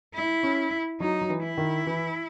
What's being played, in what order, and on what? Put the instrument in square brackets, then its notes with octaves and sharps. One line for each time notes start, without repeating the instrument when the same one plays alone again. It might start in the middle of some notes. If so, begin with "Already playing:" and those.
[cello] E4
[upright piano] C#4
[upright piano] F#3 [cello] D#4
[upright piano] F#3
E3
[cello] E4
[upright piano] D#3
E3